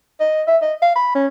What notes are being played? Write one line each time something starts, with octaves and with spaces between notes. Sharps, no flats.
D#5
E5
D#5
F5
B5
C#4